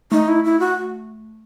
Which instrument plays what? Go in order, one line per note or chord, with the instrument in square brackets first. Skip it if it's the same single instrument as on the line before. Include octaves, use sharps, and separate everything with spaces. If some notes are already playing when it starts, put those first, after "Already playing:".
[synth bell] A3 [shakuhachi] D#4
[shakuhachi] E4
E4
F#4